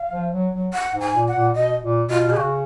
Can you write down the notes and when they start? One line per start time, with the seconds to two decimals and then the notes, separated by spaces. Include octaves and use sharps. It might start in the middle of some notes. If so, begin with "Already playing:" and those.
Already playing: F5
0.12 F3
0.32 F#3
0.53 F#3
0.74 F#5
0.95 G#2
1.00 G#5
1.15 A#2
1.28 F#5
1.35 A#2
1.55 B2 D#5
1.82 A#2
2.09 B2 F4
2.28 B2 G#4
2.36 C#3 F#4